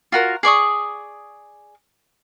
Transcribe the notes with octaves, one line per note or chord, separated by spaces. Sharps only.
F4 F#4 A#4
G#4 D5 C#6 D#6